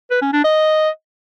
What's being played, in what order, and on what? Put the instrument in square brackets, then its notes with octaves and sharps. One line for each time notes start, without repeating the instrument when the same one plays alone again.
[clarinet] B4
C#4
D4
D#5